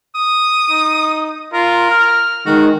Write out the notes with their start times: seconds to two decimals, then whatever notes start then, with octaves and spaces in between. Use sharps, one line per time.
0.16 D#6
0.70 D#4
1.54 F4 A#4
1.90 F6
2.46 D#3 G#3 F#4